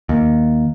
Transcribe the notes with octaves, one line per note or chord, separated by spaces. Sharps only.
D#2